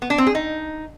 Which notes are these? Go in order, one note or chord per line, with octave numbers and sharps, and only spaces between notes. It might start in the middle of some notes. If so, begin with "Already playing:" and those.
B3
D4
C4
G#4
D#4